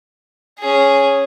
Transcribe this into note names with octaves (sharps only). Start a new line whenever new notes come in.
C#4 G#4